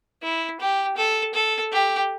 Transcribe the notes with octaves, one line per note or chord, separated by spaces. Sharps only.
E4
G4
A4
A4
G4